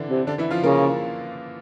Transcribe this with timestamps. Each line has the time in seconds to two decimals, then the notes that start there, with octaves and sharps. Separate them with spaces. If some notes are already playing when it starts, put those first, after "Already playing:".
Already playing: D3 E3 D4 E4
0.09 C3
0.27 D3 D4
0.38 E3 E4
0.51 F3 F4
0.63 C#3 A#3 A#4